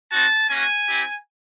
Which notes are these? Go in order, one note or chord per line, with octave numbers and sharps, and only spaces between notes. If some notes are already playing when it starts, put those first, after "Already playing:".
C4 D#4 F#4 A5
A#3 C#4 F#4 G#5
C4 E4 G4